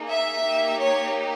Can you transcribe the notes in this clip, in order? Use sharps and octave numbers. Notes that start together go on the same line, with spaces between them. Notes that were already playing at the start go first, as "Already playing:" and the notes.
Already playing: A#3 D#4 G#4
E5
A#3 D#4 G4
C#5